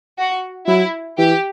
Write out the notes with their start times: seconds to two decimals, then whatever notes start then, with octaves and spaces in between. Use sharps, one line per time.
0.18 F#4
0.67 F#3 E4
1.19 E3 G4